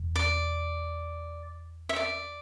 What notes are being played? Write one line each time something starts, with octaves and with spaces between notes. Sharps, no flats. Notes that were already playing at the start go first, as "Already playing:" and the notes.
Already playing: E1
D5
E5
D5